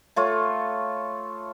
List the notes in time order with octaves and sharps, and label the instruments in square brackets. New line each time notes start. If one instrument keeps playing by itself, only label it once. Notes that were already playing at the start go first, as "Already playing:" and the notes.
[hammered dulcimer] A3 F4 C#5